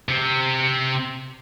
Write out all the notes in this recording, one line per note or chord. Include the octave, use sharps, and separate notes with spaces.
C3 C4